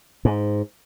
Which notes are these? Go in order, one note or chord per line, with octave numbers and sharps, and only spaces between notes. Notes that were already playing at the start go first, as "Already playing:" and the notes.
G#2